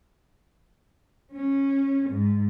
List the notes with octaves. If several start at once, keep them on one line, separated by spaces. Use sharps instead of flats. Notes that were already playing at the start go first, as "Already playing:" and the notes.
C#4
G#2